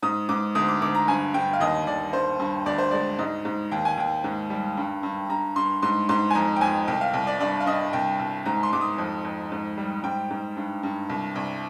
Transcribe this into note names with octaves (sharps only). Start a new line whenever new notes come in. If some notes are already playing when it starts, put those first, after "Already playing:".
G#2 D#6
G#2 D6
D2 D#6
D6
D2 D6
A#5
G2 G#5
G2 G5
F5
D#2 D#5
D#2 D5
G2 C5
G2
D2 D5
C5
G#3 D5
G#2 D#5
G#2
D#2 G5
G#5
D#2 G5
G#2
G3
G2
G2
G2 A#5
G2 C6
G#2 C6
G#2 C6
G#5
F2 A#5
G5
F2 G#5
C2 G5
F5
C2
D5
G2 D5
F5
G2 D#5
C2 G5
C2
G#2 A#5
C6
G#2 D6
D#6
F2
F2
G#2
G3
G#2 G5
G#2
G2
G2
C2
C2